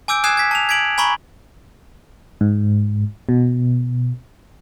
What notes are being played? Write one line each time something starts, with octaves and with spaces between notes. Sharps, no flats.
G#5 D6 E6 G6 D7
G#5 D#6 F#6 G#6 C7 E7
G#6 B6
A5 F7
G#6 B6 D7 F#7
G#5 A#5 B5 C#6 F#7
G#2
B2